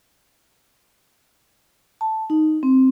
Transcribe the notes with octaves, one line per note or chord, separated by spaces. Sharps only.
A5
D#4
C4